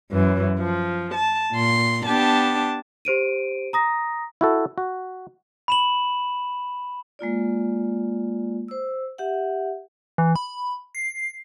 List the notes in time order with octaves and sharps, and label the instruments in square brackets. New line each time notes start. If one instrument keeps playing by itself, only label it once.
[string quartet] F#2 E3
F3
A5
A#2 C6
B3 D4 G4 A5
[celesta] G4 C5 D7 D#7
A#5 D#6 A#6
[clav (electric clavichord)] E4 F#4 A4
F#4
[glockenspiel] B5 E7 F#7
[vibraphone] G#3 A#3 F4 D5
C5 E6
G4 E5 F#5
[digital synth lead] E3
B5
C7